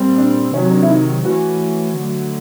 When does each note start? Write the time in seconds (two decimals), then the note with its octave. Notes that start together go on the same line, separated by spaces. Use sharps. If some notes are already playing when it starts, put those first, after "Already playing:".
Already playing: A#2 G3 C4
0.18 D4
0.53 C3 D#3 F#3 C#4
0.71 D4
0.83 E4
0.90 D#4
1.25 E3 A3 C#4 F#4
1.97 D3 F#3 A3